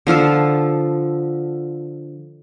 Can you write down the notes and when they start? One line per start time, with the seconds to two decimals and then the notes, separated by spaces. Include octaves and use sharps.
0.07 D3 F3 F4 A4